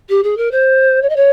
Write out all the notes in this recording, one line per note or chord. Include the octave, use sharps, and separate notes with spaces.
G4
G#4
A#4
C5
C#5
D#5
C#5